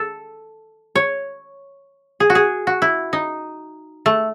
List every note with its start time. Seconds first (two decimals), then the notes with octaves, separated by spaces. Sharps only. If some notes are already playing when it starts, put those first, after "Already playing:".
Already playing: A4
0.95 C#5
2.20 G#4
2.30 F#4
2.35 G#4
2.67 F#4
2.82 E4
3.13 D#4
4.06 A3